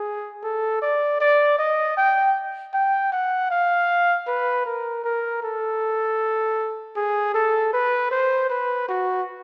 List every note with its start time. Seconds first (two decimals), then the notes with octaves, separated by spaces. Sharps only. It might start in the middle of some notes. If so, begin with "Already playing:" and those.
Already playing: G#4
0.43 A4
0.82 D5
1.20 D5
1.59 D#5
1.97 G5
2.74 G5
3.12 F#5
3.51 F5
4.27 B4
4.66 A#4
5.04 A#4
5.43 A4
6.96 G#4
7.34 A4
7.73 B4
8.11 C5
8.50 B4
8.88 F#4